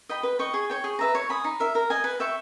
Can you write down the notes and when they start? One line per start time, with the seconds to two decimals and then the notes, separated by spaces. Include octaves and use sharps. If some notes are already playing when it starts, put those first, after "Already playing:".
0.09 D#5 G5 B5
0.23 B4
0.39 D#5 G5 C#6
0.54 G#4
0.70 C#5 G5
0.84 G#4
0.99 B4 E5 A#5
1.15 C#5
1.29 G#5 B5 D#6
1.44 D#4
1.60 A#4 E5
1.75 A#4
1.90 D#5 G#5
2.04 B4
2.20 E5 G5 C#6